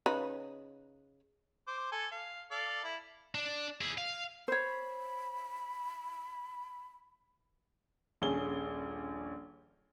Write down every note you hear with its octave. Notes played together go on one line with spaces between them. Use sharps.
C#3 D#4 B4
C5 D6
A4 G#5
F5
A4 D5 F5
E4
D4
E4 G#4
F5
C5 C#5 B5
D#1 A#1 C#4 G#4 G7